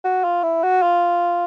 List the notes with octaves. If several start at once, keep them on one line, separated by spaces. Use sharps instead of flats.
F#4
F4
E4
F#4
F4